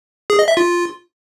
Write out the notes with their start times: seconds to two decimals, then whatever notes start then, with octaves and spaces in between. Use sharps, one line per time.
0.30 G#4
0.39 D#5
0.48 E5
0.57 F4